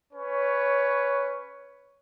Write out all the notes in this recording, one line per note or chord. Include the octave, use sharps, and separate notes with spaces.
C#4 B4 C#5